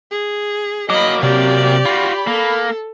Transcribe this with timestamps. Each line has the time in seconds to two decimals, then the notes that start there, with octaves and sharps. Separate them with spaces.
0.11 G#4
0.90 F#3 A#3 D#5 B5 D6
1.23 C3 G4 D5
1.86 F4 F#4 B5
2.27 A#3 A4